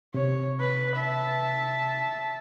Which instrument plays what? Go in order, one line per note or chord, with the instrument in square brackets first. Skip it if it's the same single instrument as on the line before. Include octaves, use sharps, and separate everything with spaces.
[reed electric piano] C3 [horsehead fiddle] C#5
[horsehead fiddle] B4
E5 A5